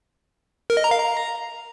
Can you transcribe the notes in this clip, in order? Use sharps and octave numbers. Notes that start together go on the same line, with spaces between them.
A#4
D#5
A#5
F5
A#5